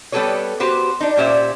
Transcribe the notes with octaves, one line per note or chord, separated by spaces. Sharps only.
G3 B3 G4 A4 B4 C#5
B3 F#4 G4 B4 C5
D4 D#4
A#2 C#4 G4 C5 D5 E5